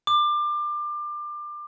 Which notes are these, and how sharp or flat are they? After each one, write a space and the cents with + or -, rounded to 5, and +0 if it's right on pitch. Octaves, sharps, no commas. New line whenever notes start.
D6 +25